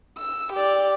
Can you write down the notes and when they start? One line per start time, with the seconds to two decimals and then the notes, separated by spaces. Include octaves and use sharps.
0.18 E6
0.53 G4 D5